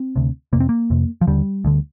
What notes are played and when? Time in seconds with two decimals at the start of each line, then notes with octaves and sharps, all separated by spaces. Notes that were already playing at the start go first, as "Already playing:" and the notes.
Already playing: C4
0.16 D2 C3
0.53 F2 C3 A#3
0.60 C4
0.69 A#3
0.90 F2 C3
1.21 F3
1.27 D#2 D3 G3
1.65 D2 D3